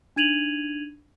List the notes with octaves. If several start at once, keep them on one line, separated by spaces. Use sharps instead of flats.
D4 D#4 G#6 D#7 F7 F#7